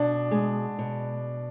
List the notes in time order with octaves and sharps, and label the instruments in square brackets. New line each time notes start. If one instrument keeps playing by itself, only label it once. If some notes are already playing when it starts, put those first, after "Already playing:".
Already playing: [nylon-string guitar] B2 [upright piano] D4
[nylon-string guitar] G#3
B2